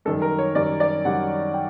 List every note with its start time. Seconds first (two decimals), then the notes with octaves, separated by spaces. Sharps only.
0.05 F#2 D#3 G3 A4
0.22 A#4
0.39 C#5
0.55 F#2 D#3 G3 D5
0.80 D5
1.04 F#2 D#3 G3 F#5
1.54 G5